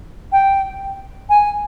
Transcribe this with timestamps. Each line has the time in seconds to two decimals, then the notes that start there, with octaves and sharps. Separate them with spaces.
0.32 G5
1.30 G#5